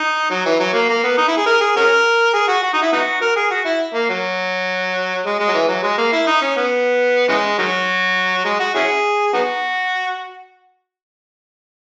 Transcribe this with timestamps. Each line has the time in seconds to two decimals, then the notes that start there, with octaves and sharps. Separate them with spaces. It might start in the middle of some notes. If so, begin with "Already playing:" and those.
Already playing: D#4
0.31 F#3
0.46 E3
0.60 F#3
0.73 A#3
0.89 A#3
1.03 B3
1.17 D#4
1.28 E4
1.37 G#4
1.46 A#4
1.61 G#4
1.77 C#4 F#4 A#4
2.34 G#4
2.48 F#4
2.63 F#4
2.73 D#4
2.82 E4
2.93 B3 D#4 F#4
3.22 A#4
3.36 G#4
3.51 F#4
3.65 E4
3.94 A#3
4.09 F#3
5.26 G#3
5.39 G#3
5.48 F#3
5.54 E3
5.69 F#3
5.83 G#3
5.98 A#3
6.13 E4
6.27 D#4
6.42 C#4
6.57 B3
7.29 C#3 E3 G#3
7.58 D#3 F#3
8.45 G#3
8.60 F#4
8.75 C#4 E4 G#4
9.33 B3 D#4 F#4